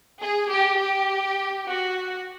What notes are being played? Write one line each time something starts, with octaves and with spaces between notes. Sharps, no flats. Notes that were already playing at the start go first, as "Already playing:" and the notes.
G#4
G4
G4
F#4